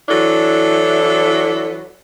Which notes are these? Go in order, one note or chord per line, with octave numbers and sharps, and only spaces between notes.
E3 F#3 D4 E4 A4